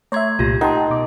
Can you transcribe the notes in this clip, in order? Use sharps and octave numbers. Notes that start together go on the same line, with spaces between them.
A3 C#5 E5 C6 G#6
C2 A#2 F4 G4 A#6
D#4 A#4 F#5 G5 A5 C6
B2 D6